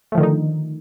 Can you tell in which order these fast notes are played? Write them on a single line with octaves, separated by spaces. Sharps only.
A3 F3 D#3 D3 D#4